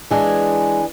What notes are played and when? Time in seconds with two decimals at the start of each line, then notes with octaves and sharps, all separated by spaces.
0.11 E3 G#3 D4 G#4